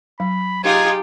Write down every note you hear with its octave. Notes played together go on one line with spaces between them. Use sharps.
F#3 B5
D#4 F4 G4 G#4 G#6